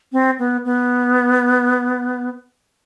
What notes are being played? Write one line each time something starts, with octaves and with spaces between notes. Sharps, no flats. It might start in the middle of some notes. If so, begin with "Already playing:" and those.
C4
B3
B3